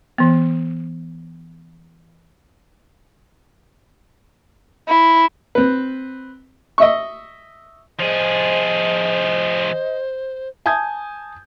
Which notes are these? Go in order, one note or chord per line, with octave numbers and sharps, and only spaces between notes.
E3 B3
E4
C4 B4
D#5 E5 C#6
F3 G#4 C5 D#5
G#5 A5 D#6 G6 G#6